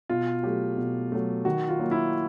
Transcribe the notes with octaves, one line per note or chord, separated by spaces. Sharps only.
B2 F4
F#3 A3 G4
B2
F#3 A3
D#3 F#4
F4
F#3 A#3
E4